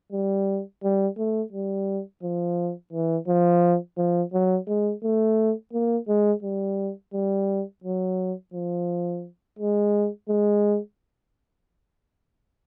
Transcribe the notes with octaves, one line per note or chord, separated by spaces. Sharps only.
G3
G3
A3
G3
F3
E3
F3
F3
F#3
G#3
A3
A#3
G#3
G3
G3
F#3
F3
G#3
G#3